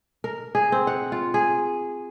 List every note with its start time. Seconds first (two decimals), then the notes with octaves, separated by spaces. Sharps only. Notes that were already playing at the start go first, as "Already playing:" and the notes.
0.24 A#4
0.55 G#4
0.72 C4
0.87 F#5
1.12 F4
1.34 G#4